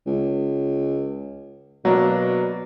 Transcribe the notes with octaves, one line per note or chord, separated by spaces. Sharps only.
C#2
B2 F#3 A#3 D4